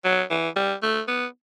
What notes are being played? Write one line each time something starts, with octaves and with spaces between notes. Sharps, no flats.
F#3
E3
G3
A3
B3